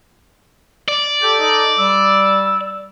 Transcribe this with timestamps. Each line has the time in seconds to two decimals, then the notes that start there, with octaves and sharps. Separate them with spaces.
0.88 D5
1.22 G4 A4
1.40 D#4
1.78 G3 E6